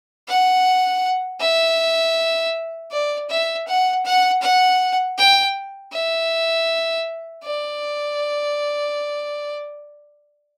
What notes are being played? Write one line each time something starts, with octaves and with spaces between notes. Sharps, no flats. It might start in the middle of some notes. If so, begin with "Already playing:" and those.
F#5
E5
D5
E5
F#5
F#5
F#5
G5
E5
D5